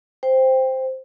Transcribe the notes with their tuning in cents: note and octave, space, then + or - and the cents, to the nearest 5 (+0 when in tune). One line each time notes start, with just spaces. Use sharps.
C5 +0 G5 +10